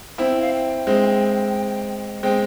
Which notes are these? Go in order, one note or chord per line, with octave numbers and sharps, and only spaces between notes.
C4 E4 G5
F5
G5
G#3 C4
G#3 C4 G5